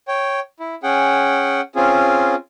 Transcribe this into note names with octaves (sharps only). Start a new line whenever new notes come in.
C#5 G5
E4
C#4 G#4 F#5 G5
C4 C#4 F4 G#4